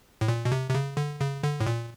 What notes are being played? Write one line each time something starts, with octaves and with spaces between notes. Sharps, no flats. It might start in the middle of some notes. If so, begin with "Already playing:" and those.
A2
A#2
B2
C3
C3
C#3
D3
C#3
D3
A2
A#2